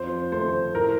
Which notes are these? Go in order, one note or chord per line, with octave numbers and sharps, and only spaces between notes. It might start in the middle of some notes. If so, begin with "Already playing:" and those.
Already playing: F2 C5
A3 C5
A2 A#4